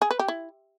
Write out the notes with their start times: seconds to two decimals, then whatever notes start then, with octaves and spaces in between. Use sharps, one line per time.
0.02 G#4
0.11 B4
0.19 G4
0.28 E4